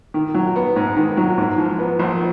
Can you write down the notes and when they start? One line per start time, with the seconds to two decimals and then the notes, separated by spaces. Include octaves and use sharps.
0.14 D#3
0.34 F#3
0.56 B3
0.76 G#2
0.97 D#3
1.17 F#3
1.38 G#2
1.58 F3
1.79 B3
1.99 A#1